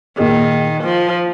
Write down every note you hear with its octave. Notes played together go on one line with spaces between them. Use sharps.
A#2 D#3 A#3 D#4 G#4
F3